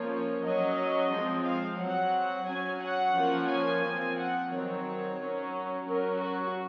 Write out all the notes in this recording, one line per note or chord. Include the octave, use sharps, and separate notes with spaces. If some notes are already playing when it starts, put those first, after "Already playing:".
Already playing: F3 A#3 C#4 C#5
F#3 C#4 D#5
F3 G#3 C4
F5
F#3 C4 F#5
F#3 C#4 G#5
F#5
F3 A#3 C#4
G#5
F3 C4
F#5
D#3 F#3 C4 C#5
F#3 C#4
F#3 C#4 A#4
F#4